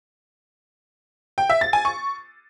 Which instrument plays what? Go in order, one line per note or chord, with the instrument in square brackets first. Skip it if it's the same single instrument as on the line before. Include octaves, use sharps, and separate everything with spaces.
[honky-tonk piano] G5
E5
A6
G#5
C#6